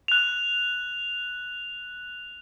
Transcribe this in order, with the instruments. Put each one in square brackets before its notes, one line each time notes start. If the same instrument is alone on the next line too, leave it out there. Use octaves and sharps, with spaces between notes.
[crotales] F#6 F7